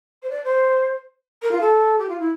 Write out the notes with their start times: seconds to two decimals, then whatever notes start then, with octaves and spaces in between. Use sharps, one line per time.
0.22 C5
0.29 D5
0.44 C5
1.42 A#4
1.51 F4
1.60 A4
1.98 G4
2.08 F4
2.19 E4